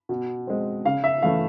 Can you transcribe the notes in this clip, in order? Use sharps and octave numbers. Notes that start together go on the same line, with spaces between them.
B2
G#3 C4
C#3 F5
E5
E3 A3 C#4 F5